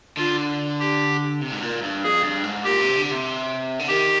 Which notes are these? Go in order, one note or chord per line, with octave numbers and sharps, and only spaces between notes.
D3 F4
G4
C3
G#2
A#2
G2
F2 G#4
G2
G#2
A#2 G4
C3
D3
C3
D3
D#3 G4